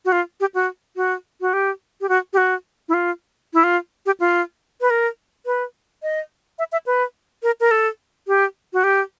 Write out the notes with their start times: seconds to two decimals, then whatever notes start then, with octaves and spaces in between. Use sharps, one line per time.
0.05 F#4
0.12 F4
0.40 G4
0.54 F#4
0.96 F#4
1.41 F#4
1.53 G4
2.01 G4
2.09 F#4
2.33 G4
2.37 F#4
2.89 E4
2.94 F4
3.54 E4
3.64 F4
4.06 G4
4.20 F4
4.81 B4
4.90 A#4
5.46 B4
6.03 D#5
6.59 E5
6.72 E5
6.86 B4
7.43 A#4
7.60 A#4
7.71 A4
8.27 G4
8.73 F#4
8.84 G4